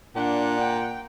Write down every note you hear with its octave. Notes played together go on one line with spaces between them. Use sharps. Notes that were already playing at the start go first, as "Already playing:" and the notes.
A#2 D4 F#5
G5